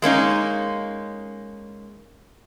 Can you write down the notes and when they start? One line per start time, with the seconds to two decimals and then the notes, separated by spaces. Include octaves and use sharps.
0.02 G#3 A#3 C#4 D#4